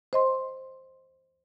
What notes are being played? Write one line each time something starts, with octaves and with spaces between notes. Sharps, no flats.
C5 D#5 C6